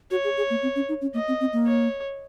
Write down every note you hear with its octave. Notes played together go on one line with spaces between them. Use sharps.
F#4 C#5
G#4
G#4
A#3
C4
C#4
D#4
C#4
A#3 D#5
C4
C4
A#3
C#5